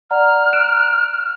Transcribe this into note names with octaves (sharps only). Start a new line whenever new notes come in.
D5 F#5 A#5 F6
F#6 D7 E7